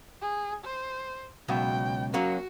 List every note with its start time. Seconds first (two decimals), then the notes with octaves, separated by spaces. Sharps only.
0.22 G#4
0.64 C5
1.48 C#2 B2 F#3 G5
2.14 F#3 A#3 C#4 F#4